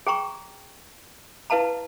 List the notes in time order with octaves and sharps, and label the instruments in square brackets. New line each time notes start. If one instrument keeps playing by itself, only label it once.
[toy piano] G#4 G5 A#5 C#6
E4 B4 F5 A5 A#5